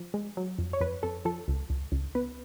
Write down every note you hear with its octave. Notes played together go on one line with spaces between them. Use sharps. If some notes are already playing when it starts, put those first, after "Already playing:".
Already playing: F3
G#3
F#3
F2
C#5
F2 B4
F2 A4
F3 A4
C#2
C#2
C#2
B3 B4